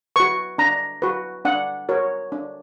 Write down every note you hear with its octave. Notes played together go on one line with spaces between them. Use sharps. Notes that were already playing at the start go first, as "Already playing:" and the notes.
F#4 B4 C#6
D4 A#5
F#4 B4
D4 F#5
F#4 A#4 C#5
D4